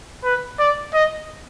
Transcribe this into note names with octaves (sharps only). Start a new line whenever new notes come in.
B4
D5
D#5